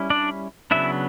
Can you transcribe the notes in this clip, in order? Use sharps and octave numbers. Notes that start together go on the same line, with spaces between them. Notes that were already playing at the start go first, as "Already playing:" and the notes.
Already playing: G3 C#4 E4
D4 D5
C#3 F#3 B3 D4 E4 E5